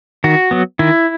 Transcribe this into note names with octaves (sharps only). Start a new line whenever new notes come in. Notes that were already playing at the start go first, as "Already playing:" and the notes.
D#3 F#4
F#3 B3
D#3 E4